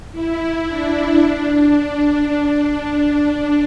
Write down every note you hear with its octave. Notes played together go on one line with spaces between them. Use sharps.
E4
D4
D4